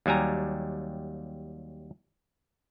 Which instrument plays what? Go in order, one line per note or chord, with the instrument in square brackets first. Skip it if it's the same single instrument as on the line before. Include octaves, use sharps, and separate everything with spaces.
[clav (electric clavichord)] D#2 F#3 G3 G#5 A#5